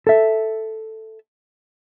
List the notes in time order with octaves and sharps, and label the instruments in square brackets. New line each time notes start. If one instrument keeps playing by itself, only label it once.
[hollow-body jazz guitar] A4 E5